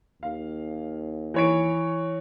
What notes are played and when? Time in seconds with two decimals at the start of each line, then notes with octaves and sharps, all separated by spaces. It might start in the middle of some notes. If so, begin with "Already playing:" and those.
0.23 D#2 F5
1.34 E3 C#5 D7